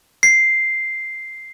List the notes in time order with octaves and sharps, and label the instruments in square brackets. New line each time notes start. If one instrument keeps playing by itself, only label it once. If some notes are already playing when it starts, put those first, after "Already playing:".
[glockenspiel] C7